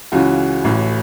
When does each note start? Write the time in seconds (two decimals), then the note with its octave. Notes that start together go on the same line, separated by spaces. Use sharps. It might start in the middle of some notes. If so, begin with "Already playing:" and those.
0.12 C#2 C#3 E3 F#4
0.64 A1 A2 E3